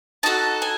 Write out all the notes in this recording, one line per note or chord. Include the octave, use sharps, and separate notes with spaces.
D#4 F#4 A4 A5
G#5